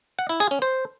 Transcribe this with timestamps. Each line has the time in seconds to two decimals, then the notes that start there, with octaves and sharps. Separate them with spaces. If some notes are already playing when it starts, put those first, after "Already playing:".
0.19 F#5
0.29 E4
0.40 G#4
0.51 C#4
0.62 C5